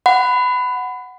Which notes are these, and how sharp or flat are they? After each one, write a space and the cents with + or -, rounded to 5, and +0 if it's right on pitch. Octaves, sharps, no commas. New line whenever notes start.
F#5 +0 B5 +20